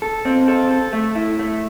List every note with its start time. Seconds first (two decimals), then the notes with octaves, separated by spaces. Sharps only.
0.02 A4
0.25 C4
0.48 A4
0.71 A4
0.93 A3
1.15 E4
1.39 A3